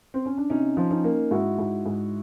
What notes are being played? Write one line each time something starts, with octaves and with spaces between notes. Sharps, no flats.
C4
C#4
D4
C3 C#4 D#4
F3
C#4 D#4
A#3
G#2 E4 F#4
G#2
G#2